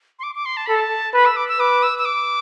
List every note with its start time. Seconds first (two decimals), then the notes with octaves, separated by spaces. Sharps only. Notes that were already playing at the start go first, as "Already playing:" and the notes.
0.19 C6
0.23 D6
0.35 D6
0.45 C6
0.57 A5
0.66 A4 B5
0.75 A5
1.14 B4 B5
1.25 E6
1.36 D6
1.49 E6
1.59 B4 D6
1.83 E6
1.99 E6
2.05 D6